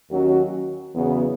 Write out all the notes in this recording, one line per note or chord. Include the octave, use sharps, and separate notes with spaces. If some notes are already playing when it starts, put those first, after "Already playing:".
D#2 D#3 F#3 C#4 F#4
E2 C#3 F#3 B3